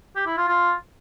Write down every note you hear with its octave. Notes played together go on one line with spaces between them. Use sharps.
G4
E4
F4
F4